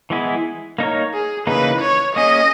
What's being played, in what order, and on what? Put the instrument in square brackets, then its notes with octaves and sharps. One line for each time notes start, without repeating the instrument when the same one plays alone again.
[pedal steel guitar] E3 G#3 B3 E4 G#4
A#3 D#4 A#4 C#5
[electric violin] G#4
[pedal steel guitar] C#3 E3 A#3 D#4 [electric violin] B4
[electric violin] C#5
[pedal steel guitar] A#3 C#4 G#4 [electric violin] D#5